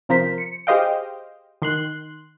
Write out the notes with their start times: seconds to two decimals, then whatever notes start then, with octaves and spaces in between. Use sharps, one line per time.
0.09 C3 F3 A#4 C5 B6
0.38 C#7
0.67 G4 G#4 C5 D#5 F5 G5
1.62 D#3 C6 F#6